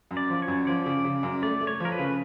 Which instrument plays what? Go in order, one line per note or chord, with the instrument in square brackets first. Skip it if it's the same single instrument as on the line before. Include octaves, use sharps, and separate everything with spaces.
[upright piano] F#2
[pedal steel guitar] D5
[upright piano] F3
[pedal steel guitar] C#5
[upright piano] F#2
[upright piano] F3 [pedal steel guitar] D5
[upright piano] C#3
C#3
F#2
[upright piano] A3 [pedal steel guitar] D5
[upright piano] A3
[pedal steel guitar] C#5
[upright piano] F3 [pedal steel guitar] A#4
[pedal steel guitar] B4
[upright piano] C#3